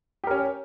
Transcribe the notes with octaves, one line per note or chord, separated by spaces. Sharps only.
C#4 G4 A#4